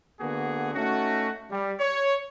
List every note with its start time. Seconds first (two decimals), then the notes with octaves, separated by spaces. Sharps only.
0.20 D3 A#3 B3 F#4 G#4
0.74 A3 C#4 D#4 F#4
1.50 G3
1.80 C#5